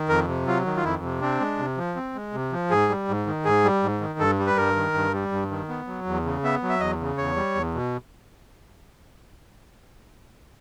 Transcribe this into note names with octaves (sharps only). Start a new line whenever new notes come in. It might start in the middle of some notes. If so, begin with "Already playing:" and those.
Already playing: D#3
F2 A#4
C3
F#3 F4
D#3
F4
F2 E4
C3
C4 D4
G#3
C3
F3
C4
G#3
C3
F3
G#2 G#4
G3
G#2
D#3
G#2 G#4
G3
G#2
D#3
G2 A4
G3
B4
G2 A#4
D#3
G2
G3
G2
D#3
B3
F#3
E2
C#3
B3 E5
F#3
E5
E2 D#5
C#3
E2 C#5
G3
E2
B2